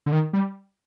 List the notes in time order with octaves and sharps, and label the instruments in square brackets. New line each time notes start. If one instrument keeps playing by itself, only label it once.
[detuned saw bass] D3
D#3
G3